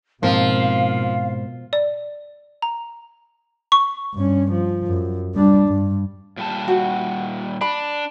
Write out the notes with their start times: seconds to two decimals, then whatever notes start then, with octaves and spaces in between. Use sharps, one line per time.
0.23 G#2 B2 F3 A#3 C4 F5
1.73 D5
2.62 A#5
3.72 C#6
4.14 G2 C#4
4.52 F3
4.87 F#2
5.35 G3 D4
5.68 G2
6.37 A#2 G3 A5
6.68 F#4
7.61 D4 B5